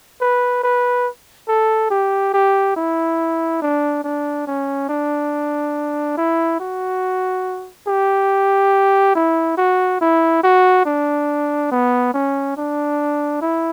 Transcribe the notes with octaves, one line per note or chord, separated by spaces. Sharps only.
B4
B4
A4
G4
G4
E4
D4
D4
C#4
D4
E4
F#4
G4
E4
F#4
E4
F#4
D4
B3
C#4
D4
E4